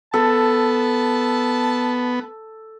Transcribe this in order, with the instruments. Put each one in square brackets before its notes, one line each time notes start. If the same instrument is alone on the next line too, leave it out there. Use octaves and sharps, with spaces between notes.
[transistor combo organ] B3 [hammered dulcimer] A4 [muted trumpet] A5